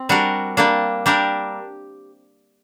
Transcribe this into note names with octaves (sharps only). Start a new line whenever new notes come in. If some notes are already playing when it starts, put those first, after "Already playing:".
Already playing: C4
G3 D4 F#4 A#4
G3 A#3 D4
G3 D4 G4 A#4